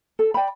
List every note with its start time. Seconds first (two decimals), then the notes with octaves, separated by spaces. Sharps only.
0.19 A4
0.34 D5 G5 B5